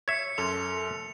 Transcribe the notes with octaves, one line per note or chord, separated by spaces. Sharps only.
C#5 E5 C#7
F#2 A4 C6 F7